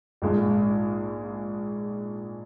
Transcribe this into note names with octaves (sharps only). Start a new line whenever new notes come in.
A#1 G#2 G#3 F4